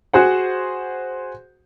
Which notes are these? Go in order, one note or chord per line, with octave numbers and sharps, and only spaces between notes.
F#4 G#4 C5 F#5